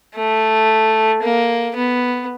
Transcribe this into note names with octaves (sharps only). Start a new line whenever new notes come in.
A3
A#3
B3